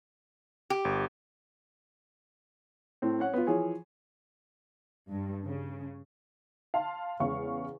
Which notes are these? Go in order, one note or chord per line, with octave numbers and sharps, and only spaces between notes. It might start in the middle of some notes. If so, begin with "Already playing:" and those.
G4
G1
A2 C4
C#4 C#5 F#5
B3 F4
E3 F3 G#4 C#5
G2
C#3
F5 A5 C6
E2 C#3 G#3 C#5 F5 C#6